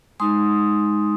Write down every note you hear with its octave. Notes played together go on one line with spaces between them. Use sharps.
G#3 D#4 C6 D#6